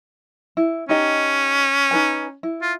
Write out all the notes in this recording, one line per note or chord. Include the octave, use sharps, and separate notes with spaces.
E4
C#4 D#4 G4 D#5
D#4 B4 G#5
E4
F4